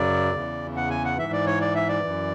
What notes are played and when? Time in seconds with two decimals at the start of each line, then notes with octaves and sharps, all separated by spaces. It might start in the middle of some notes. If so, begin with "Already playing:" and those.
Already playing: F#2 C#3 F#3 D5
0.34 E2 C#3 E3
0.77 F#5
0.90 G#5
1.05 F#5
1.19 G#2 E3 E5
1.33 D5
1.46 C#5
1.61 D5
1.75 E5
1.89 D5
2.03 F#2 E3